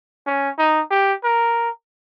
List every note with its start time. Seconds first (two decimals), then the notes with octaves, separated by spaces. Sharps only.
0.27 C#4
0.58 D#4
0.91 G4
1.24 A#4